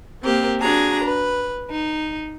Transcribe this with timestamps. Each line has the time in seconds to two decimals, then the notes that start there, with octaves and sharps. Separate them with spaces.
0.24 A#3 C4 G4 A#4
0.60 D4 F#4 G#4 A#5
1.03 B4
1.71 D#4